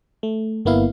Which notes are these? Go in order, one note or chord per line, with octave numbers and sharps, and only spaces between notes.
A3
G1 A#3 B3 E4 F5